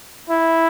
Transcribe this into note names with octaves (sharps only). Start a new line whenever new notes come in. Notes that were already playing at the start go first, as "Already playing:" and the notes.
E4